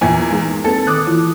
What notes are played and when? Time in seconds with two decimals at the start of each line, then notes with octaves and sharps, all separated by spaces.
0.01 E2 A#2 A#3 E5 G#5
0.30 G#3 D#4 G#4
0.64 A#3 C4 A4 B4
0.87 D#3 D6 D#6 F#6
1.07 E3 E4 F4